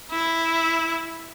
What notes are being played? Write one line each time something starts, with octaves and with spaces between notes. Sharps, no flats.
E4